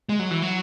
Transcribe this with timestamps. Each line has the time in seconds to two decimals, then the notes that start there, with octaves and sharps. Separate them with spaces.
0.09 G#3
0.19 F#3
0.31 E3
0.42 F#3